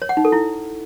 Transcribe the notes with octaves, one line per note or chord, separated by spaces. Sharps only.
C#5
F#5
D#4
A4
E4